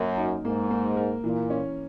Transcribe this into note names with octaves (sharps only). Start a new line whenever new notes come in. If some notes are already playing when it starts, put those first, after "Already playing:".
Already playing: F#2 A#3 A#4
D#4
G#2 A#3
A#3
A#4
A#2 E3
C#4